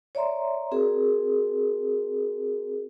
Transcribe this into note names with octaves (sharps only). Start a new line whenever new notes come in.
C#5 D5 E5 A#5 C6
C4 F#4 G#4 A#4